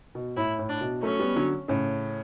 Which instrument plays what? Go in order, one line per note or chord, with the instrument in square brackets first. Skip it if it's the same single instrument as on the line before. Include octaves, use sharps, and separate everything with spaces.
[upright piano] B2
[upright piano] A2 [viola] E4
[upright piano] A2
[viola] D4
[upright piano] B2
[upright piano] F#3 A3 [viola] C#4
[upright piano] G3 B3
D3 F#3
A2 C#3